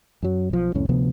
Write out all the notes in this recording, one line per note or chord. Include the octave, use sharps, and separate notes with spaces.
F#2 F#3
B1 F3
C2 F2 A2 C#4
D2 C3 F3 B3